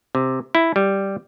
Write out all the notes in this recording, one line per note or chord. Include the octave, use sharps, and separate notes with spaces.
C3
E4
G3